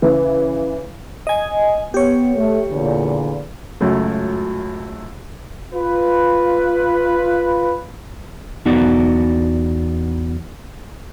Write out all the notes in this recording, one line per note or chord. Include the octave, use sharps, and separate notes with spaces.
C#3 E3
D#5 G#5
B3 G4 C#5
A3
E2 A#2 D3
C#2 F#2 F#3 A3
F4 B4
E2 B3 D#4 F#4 D5